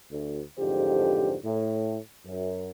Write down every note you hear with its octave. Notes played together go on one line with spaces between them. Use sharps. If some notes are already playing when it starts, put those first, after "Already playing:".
D2
A1 F2 G#2 D3 G4 C5
A2
F#2